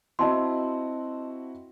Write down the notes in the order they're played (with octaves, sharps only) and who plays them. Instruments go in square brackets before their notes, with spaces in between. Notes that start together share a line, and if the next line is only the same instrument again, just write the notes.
[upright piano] C4 E4 F#4 [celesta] D#5 A5 C6